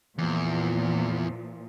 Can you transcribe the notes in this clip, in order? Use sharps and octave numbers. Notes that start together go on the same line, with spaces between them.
E2 A#2 E3 F3